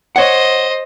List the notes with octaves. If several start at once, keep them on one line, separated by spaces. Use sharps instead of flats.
C5 C#5 D#5 F#5